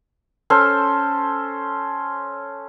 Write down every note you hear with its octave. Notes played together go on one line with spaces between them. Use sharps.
C#4 A4 C5